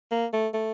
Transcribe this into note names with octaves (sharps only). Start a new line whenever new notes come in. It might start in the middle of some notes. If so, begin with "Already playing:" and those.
A#3
A3
A3